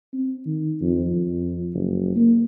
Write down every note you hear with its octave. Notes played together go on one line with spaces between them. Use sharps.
C4
D#3
F2
F2
F#1
A#3